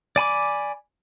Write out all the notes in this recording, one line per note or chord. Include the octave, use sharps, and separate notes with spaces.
D5 G#5 B5 D6